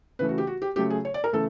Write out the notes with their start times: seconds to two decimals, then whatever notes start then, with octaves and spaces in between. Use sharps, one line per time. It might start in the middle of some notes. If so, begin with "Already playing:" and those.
0.19 C#3 E3 A3 B4
0.29 F#4
0.38 G4
0.47 F#4
0.62 G4
0.76 C#3 F#3 A3 G4
0.90 G#4
1.05 C#5
1.14 D5
1.24 A#4
1.33 C#3 E3 A3 A4